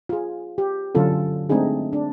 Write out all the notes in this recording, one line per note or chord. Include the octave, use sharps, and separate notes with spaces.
F4 G#4
G4
D3 F#3 C#4 F4 A4
G#3 A3 C4 D4 D#4 G#4
D4